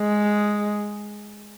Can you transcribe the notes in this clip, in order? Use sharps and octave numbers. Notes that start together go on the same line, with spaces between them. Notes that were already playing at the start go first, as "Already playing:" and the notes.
Already playing: G#3